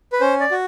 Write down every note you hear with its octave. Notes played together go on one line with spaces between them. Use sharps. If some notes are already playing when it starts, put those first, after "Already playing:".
B4
C#4 C5
D5
F#4